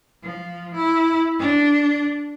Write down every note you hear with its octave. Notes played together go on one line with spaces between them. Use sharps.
F3
E4
D4